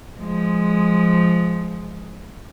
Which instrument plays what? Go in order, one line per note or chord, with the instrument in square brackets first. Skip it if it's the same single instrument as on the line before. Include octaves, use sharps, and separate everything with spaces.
[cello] F3 G#3